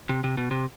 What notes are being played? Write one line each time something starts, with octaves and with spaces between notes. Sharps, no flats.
C3
C3
B2
C3